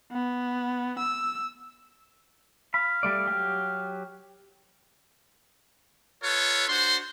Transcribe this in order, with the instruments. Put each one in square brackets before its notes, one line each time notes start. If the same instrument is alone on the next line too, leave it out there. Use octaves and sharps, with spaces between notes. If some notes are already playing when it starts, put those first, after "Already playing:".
[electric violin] B3
E6
[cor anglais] F5 [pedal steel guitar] B5
[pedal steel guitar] G3 A3 D5
F#3 G4
[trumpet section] F4 A4 B4 C#5
D4 F#4 C5 C6